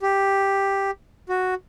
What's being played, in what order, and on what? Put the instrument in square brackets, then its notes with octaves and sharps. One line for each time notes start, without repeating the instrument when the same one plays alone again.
[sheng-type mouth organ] G4
F#4